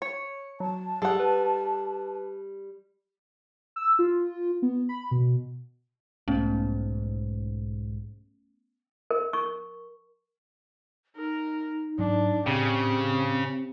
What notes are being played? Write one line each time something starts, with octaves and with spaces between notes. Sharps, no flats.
C#5 C#7
F#3 A5
G3 G#4 A4 F#5
B4
E6
F4
B3
B5
B2
B1 G#2 A3 B3 C#4
A#4
C#6
D#4 A#4
G#2 F#3 C#4 D4
A2 C#3 C4 G4